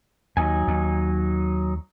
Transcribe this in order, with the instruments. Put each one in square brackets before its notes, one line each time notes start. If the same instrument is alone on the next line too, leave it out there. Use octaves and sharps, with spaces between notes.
[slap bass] D#2 [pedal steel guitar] F#3 D#4 G#5
[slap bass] D#2